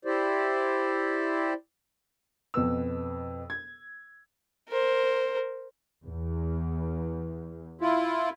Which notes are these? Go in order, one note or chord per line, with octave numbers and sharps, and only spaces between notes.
E4 G4 C5 D5
F2 B2 B3 E6
G#6
A#4 C5
E2
E4 F4